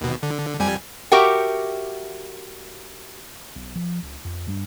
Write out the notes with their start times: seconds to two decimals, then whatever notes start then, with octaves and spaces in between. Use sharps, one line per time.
0.01 D#2 B2
0.23 D3
0.60 F2 G3 G#5
1.12 F#4 G4 A#4 E5 F#5 G5
3.56 B1
3.75 F3
4.02 C#2
4.25 F2
4.47 G2 G3 B3 D4